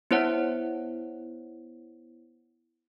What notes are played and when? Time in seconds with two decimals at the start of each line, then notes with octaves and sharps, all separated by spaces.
0.11 B3 E4 C5 C#5 F#5